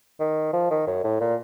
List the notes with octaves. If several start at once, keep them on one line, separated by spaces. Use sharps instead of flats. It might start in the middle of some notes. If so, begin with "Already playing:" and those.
D#3
F3
D#3
F#2
A2
A#2